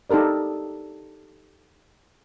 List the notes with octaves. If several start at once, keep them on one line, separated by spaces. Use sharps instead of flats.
D#4 G4 A4 A#4 D5